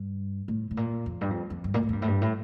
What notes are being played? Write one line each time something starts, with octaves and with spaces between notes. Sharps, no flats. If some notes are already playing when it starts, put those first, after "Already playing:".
Already playing: G2
A2
A2
A#2
F2
G2
F2
F2
G2
A#2
A2
F2
G2
A2
G2
A2